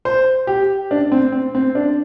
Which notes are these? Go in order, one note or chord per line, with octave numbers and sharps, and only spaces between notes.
C5
G4
D4
C4
C4
C4
D4